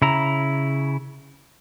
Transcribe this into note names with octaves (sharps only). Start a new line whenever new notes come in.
C#3 E4 A#5